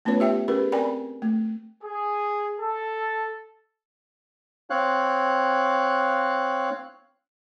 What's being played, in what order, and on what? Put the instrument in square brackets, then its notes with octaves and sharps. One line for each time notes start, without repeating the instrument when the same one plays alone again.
[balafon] A3 B3 C#4 F4 B4 C#5
G4 E5 G5
C#4 G4 G#4 A#4 B4
C4 A#4 D5 G5 G#5 B5
A3
[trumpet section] G#4
A4
[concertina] C4 C#5 F5 F#6